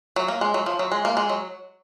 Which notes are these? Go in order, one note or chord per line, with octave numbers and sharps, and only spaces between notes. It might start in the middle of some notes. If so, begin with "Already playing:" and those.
F#3
A#3
G#3
F#3
F3
F#3
G#3
A#3
G#3
F#3